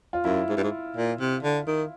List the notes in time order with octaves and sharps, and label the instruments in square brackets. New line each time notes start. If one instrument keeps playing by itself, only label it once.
[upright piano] F4
[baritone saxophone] F#2 [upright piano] E4
[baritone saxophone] G#2
G2
G#2
A#2
C3
D3
D#3